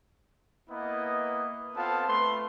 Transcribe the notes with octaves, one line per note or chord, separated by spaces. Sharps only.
A#3 B3 E4 B4 D#5
B3 C4 F4 A4 F5 A5
A3 B4 C6